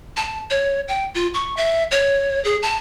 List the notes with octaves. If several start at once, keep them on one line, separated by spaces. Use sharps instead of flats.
A5
C#5
G5
F4
C#6
E5
C#5
G#4
A5